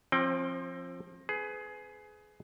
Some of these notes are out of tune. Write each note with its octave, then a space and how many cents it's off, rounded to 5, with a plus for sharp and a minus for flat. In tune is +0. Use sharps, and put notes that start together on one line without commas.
F3 +0 C4 +30 G5 +0
G#4 +20 B4 +30